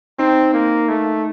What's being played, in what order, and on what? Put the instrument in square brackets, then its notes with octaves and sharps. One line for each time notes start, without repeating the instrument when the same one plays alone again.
[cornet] C4 [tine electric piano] D#4
[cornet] A#3
A3